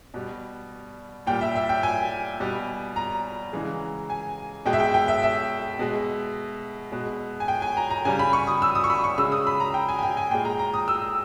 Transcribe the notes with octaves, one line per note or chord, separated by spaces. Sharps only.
B2 G3
A#2 G3 G5
E5
E5
G5
G#5
B2 G3
A#5
C#3 E3 G#3
G#5
B2 G#3 G5
E5
G5
G5
E5
E5
B2 G#3
B2 G#3
G#5
G5
G#5
A#5
A#5
C#3 G3 G#5
B5
C#6
D#6
E6
D#6
C#6
B5
C#6
C#3 G#3 E6
D#6
B5
A#5
G5
G#5
G#5
G5
G#5
A#2 G#3 G5
A#5
A#5
D#6
E6